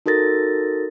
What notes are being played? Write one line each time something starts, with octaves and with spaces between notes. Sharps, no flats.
D#4 F#4 A4 A#4 A6 A#6